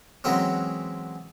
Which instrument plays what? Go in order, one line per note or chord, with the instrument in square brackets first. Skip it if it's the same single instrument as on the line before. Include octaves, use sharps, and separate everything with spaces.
[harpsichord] E3 F#3 G#3 C4 C#4